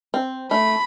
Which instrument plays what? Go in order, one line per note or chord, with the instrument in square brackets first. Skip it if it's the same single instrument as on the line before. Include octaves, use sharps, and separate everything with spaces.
[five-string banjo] C4
[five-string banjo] A3 [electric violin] B5